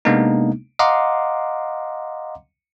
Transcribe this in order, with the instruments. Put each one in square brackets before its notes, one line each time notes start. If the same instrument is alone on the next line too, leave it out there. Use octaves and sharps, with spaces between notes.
[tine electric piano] C3 G#3 A#3 B3 D4 D#4
D#5 F5 F#5 A#5 C6 D6